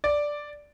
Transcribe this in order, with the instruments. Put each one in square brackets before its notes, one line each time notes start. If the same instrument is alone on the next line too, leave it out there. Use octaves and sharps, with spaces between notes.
[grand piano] D5